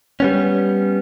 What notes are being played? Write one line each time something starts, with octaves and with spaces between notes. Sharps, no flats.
G3 B3 C#4